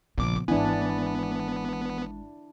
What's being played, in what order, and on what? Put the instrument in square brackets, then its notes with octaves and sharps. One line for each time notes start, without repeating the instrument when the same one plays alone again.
[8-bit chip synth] A#1 D6 [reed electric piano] A#2 C#3 F3 [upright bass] B3
[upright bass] G#1 G#3 [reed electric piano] E3 G#5 [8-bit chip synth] B3 [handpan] D4 E4